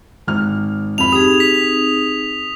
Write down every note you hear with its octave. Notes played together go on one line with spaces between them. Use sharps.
G#1 F6
F2 B5 F7
C4 D#4 G4 G#4 D#6
B6